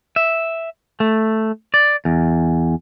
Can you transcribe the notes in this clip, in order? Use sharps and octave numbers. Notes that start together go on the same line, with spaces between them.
E5
A3
D5
E2